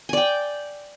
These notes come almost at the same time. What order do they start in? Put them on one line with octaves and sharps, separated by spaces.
G#5 D5 G5